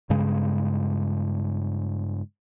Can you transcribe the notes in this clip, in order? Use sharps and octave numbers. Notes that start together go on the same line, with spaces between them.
G2 C#3 G#3